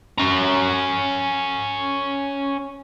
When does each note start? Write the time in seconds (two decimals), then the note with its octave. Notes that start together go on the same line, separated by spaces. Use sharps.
0.18 C#4 A#5